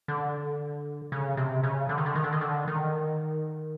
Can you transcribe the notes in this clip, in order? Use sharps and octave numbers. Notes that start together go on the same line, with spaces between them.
D3
C#3
C3
C#3
D3
D#3
D3
D#3
D3
D#3
D3
D#3